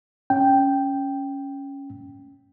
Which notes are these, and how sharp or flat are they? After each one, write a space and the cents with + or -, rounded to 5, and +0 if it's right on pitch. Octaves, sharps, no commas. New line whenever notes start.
C#4 +0 G5 +0